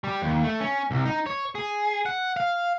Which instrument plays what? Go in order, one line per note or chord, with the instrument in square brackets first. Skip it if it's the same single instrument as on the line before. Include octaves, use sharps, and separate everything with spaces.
[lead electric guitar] G3
D#2
A3
C#4
C2
D#4
C#5
G#4
F#5
F5